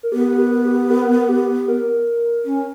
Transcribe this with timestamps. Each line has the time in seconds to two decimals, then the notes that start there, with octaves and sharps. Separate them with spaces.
0.03 A#4
0.12 B3 G4
0.38 A#4
0.65 G4
0.90 A#4
1.21 A#4
1.29 G4
1.68 A#4
2.45 C#4